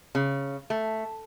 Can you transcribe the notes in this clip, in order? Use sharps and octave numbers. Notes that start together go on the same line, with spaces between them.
C#3
A3